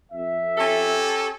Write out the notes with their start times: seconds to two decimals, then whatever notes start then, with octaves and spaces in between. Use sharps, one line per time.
0.12 F2 E5
0.57 C#4 G4 A4